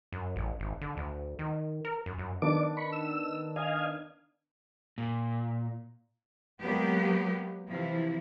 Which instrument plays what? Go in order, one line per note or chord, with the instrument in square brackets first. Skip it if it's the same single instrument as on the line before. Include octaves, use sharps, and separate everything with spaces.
[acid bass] F#2
A1
G#1
D3
D2
D#3
A#4
F#2
F#2
[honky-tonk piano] D#3 B3 D4 [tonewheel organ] D5 D6
[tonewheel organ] B5 C#6
E6
D#5 F5 G#5
[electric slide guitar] A#2
[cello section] F#3 G#3 A#3 B3 G4
C3 E3 F3 E4